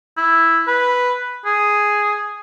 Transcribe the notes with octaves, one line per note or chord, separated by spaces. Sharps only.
E4
B4
G#4